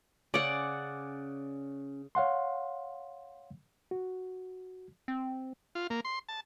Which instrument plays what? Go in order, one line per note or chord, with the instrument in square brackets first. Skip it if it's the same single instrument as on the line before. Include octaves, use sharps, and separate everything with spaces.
[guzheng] C#3 [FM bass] C#4 [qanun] D5 F#5
[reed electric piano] C#5 F5 F#5 C6
F#4
[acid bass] C4
[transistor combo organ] F4
A#3
C6
A5